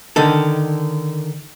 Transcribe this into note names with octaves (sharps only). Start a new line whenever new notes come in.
D3 D#3 A4